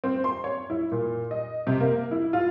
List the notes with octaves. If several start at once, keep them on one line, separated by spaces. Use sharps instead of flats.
C4
C6
C#5
E4
A#2
D#5
C3
A#3
E4
F4